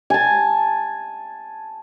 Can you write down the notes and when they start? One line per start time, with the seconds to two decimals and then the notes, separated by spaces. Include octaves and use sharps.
0.10 G#5 A5